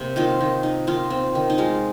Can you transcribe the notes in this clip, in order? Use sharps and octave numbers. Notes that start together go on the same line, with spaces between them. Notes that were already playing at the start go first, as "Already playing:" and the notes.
Already playing: C3 A#3 C5
D#3 F4
D#3
D#4
D#3 F4
C4
D#3
D#4
G#3 F4